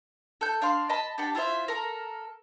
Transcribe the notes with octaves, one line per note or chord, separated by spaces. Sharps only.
A4 G6
D4 F5 C6
D#5 A5 B5
D4 G4 F#5 A5
E4 F4 C5 E5
A4 A#4